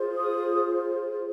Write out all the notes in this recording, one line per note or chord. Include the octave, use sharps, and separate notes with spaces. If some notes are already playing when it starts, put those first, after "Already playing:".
Already playing: F4 G#4 C5
D#6